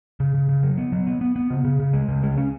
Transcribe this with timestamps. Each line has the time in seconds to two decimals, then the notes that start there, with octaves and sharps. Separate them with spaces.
0.20 C#3
0.34 C#3
0.49 C#3
0.63 F#3
0.78 B3
0.92 F#3
1.07 B3
1.21 B3
1.36 B3
1.50 C#3
1.65 C#3
1.80 C#3
1.93 G#3
2.08 C#3
2.23 G#3
2.37 C#4